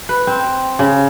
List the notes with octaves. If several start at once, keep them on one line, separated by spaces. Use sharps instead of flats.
B4
C4
C#3